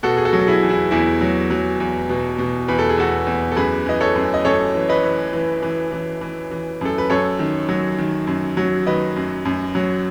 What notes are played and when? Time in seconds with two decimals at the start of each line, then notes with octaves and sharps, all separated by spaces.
0.03 B2 F#4 A4
0.17 G#4
0.25 F#4 A4
0.33 F#3
0.39 A4
0.47 E4 G#4
0.62 E2
0.69 E4 G#4
0.91 E2 E4 G#4
1.21 F#3
1.50 F#3
1.80 E2
2.09 B2
2.38 B2
2.68 E2 B4
2.79 A4
2.89 G#4
2.98 E2 F#4 A4
3.27 E2
3.52 A4
3.56 F#2 G#4 B4
3.86 E3 D#5
4.01 A4 C#5
4.15 F#2
4.34 D#5
4.45 F#2 A4 C#5
4.75 E3
4.89 B4 D#5
5.03 E3
5.33 E3
5.62 E3
5.92 E3
6.21 E3
6.51 E3
6.81 F#2 A4
6.98 B4
7.10 F#2 A4 C#5
7.39 D#3
7.69 F#3
7.98 D#3
8.27 F#2
8.57 F#3
8.86 D#3 B4 D#5
9.16 F#2
9.45 F#2
9.75 F#3